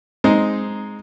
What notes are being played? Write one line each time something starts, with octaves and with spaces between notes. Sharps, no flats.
G#3 C4 D#4